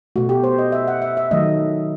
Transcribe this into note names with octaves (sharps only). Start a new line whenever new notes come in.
B2 A3 F#4
G4
C5
D#5
E5
F#5
E5
E5
D#3 F#3 A3 D#5